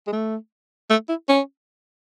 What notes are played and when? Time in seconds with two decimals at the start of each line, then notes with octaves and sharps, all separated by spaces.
0.07 G#3
0.12 A3
0.90 A3
1.08 E4
1.29 C#4